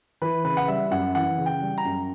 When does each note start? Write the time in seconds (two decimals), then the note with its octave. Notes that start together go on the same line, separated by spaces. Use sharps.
0.22 E3 B4
0.45 C#3 B4
0.57 F#5
0.68 G3 E5
0.91 F#2 F#5
1.15 E3 F#5
1.38 C#3
1.46 G5
1.62 G3
1.78 A#5
1.85 F#2